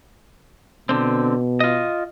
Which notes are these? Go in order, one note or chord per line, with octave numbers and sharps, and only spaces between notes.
B2 D3 C4
F4 D#5